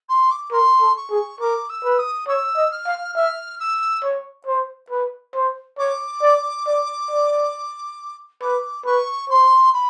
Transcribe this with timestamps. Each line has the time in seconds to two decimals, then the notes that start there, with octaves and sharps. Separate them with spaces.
0.08 C6
0.30 D6
0.52 A#4 C6
0.81 A4
0.96 C#6
1.11 G#4
1.40 A#4 D6
1.69 E6
1.84 B4
1.98 D#6
2.27 C#5 E6
2.56 D#5
2.71 F6
2.86 F5
3.15 E5 F6
3.59 E6
4.03 C#5
4.47 C5
4.90 B4
5.34 C5
5.78 C#5 D6
6.22 D5
6.67 D5
7.10 D5
8.41 B4 D6
8.85 B4 C#6
9.29 C5 C6
9.73 B5